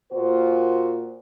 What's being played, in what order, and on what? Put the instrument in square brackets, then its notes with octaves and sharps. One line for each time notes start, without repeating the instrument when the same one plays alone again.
[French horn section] A#2 F4 F#4 C5